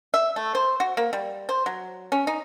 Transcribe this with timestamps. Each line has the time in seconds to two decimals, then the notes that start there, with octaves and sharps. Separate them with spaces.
0.14 E5
0.36 A3
0.55 C5
0.80 F#4
0.97 A#3
1.13 G3
1.49 C5
1.66 F#3
2.12 C#4
2.27 D#4